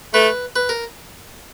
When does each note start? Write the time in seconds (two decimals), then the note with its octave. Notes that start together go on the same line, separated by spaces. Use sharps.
0.14 A3 B4
0.56 B4
0.69 A#4